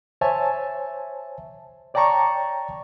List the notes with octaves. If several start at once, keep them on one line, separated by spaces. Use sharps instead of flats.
C5 C#5 E5 G#5 A5
C#5 D5 G5 A5 A#5 C#6